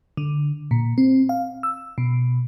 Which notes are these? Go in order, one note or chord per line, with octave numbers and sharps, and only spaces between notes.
D3
A#2
C4
F5
E6
B2